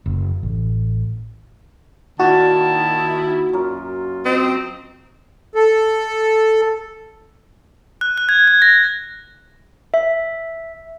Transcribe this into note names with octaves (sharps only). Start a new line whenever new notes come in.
F#1
A1
A#2 D#3 E4 F#4 A5
F#2 F4 A#4
C4 D#5
A4
F#6
F#6
G#6
G#6
A#6
E5